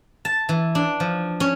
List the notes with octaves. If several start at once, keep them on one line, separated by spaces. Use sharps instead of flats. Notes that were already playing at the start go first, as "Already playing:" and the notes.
A5
E3
D4
F3
C#4